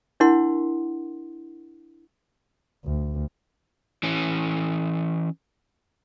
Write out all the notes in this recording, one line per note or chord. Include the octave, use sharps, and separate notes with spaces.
D4 E4 A#4 F#5 C6
D2
E3 C#4